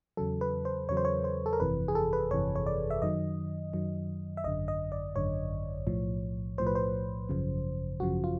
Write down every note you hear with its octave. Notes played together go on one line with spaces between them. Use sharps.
E2 C#3 F#3 A4
B4
C5
E2 C#3 F#3 C#5
C5
C#5
C5
A4
A#4
G1 F2 C3 E3 B4
G#4
A4
B4
G1 F2 C3 E3 C#5
C#5
D5
E5
F#2 D#3 F#3 D#5
F#2 D#3 F#3
E5
G#1 F#2 D3 D#5
D#5
D5
G#1 F#2 D3 C#5
B1 A2 F3
B1 A2 F3 C5
B4
C5
G#1 F#2 C#3 F3
G#1 F#2 C#3 F3 F#4
F4